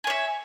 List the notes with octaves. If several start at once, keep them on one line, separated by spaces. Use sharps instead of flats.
C#5 E5 G#5